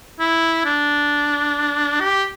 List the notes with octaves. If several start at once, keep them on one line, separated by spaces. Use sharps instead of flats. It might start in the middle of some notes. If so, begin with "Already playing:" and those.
E4
D4
G4